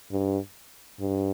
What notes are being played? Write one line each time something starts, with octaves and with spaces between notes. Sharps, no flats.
G2
G2